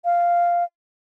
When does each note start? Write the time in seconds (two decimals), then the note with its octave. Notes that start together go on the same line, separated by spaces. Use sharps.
0.05 F5